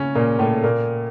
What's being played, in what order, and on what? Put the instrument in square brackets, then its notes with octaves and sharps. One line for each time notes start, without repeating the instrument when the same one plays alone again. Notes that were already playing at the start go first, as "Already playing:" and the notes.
Already playing: [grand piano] C#3 C#4
A#2 A#3
A2 A3
A#2 A#3